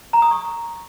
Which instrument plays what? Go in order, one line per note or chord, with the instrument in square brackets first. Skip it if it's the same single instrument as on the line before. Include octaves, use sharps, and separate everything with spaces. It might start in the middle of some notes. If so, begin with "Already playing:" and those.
[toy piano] A#5
D#6
C#6